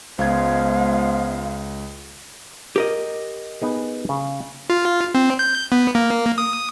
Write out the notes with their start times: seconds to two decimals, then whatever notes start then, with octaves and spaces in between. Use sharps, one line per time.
0.19 C#2 F3 G#3 B3 F5 G#6
2.76 G4 A#4 D#5
3.62 B3 D#4 G#4
4.09 C#3
4.70 F4
5.15 C4
5.39 G6
5.72 B3
5.95 A#3
6.38 D#6